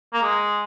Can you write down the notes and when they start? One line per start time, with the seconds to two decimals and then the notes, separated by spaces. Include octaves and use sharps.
0.13 A#3
0.22 G#3